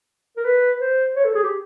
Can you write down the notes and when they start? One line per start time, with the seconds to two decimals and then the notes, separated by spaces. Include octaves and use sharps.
0.37 A#4
0.45 B4
0.81 C5
1.16 C#5
1.25 A4
1.35 G#4
1.43 G4